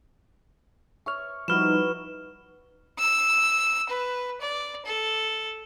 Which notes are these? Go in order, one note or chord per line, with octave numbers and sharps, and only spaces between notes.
C#5 E5 C#6 F6
F3 G3 D#4 E4 F#4 B4 F6 E7
E6
B4
D5
A4